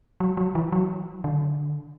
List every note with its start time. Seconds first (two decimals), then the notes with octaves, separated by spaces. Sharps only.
0.20 F#3
0.37 F#3
0.55 E3
0.72 F#3
1.24 D3